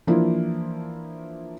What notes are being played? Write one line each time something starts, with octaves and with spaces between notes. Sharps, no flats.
E3 F3 A#3 D4 E4 F4